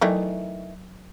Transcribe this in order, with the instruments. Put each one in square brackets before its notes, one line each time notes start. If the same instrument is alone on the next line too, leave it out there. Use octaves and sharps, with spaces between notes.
[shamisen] D#3 E3 A3 [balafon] F#3